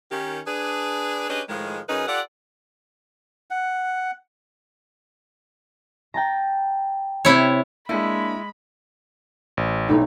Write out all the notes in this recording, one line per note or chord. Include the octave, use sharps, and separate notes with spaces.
D#3 C#4 G4
D4 G#4 B4
C#4 D4 G4 G#4 B4 D#5
A2 D#3 F3 G#3
F#2 C#4 D#4 G#4 B4
F4 G4 A4 D5 F#5
F#5
G5 A5 A#5
C3 E4 C#5
G#3 A#3 D4 E4 B5
A1
B1 A2 D4 D#4